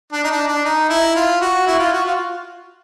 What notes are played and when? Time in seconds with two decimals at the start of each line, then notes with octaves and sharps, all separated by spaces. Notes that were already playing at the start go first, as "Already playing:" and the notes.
0.13 D4
0.24 D#4
0.31 D4
0.48 D4
0.65 D#4
0.89 E4
1.16 F4
1.41 F#4
1.67 E4
1.79 F4
1.93 F#4
2.05 F4